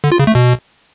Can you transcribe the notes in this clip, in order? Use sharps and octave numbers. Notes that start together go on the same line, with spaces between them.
D3
F4
C#3
A3
B2